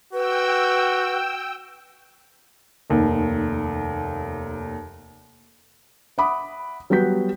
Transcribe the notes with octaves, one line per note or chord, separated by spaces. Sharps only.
F#4 B4 G5 E6
F1 D#2
E5 F#5 B5 D6 D#6
F#3 G3 B3 F#4 G6 B6